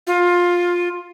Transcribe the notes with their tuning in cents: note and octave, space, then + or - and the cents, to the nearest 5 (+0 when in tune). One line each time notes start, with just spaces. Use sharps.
F4 +15